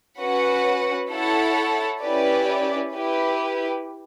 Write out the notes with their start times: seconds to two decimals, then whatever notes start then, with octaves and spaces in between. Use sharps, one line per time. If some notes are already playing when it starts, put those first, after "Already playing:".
0.19 C#4 F#4 B4 F#5
1.11 E4 A4 C#5 F#5 A5
2.02 C#4 E4 G4 B4 D5
2.94 E4 G4 B4